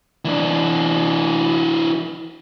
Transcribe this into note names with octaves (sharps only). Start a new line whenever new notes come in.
E3 D4